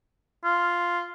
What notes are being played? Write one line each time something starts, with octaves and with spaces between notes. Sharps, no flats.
F4